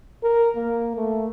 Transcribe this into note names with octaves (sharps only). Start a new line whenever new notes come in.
A#4
A#3
A3